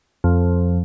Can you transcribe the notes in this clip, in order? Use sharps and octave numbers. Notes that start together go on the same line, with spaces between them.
F2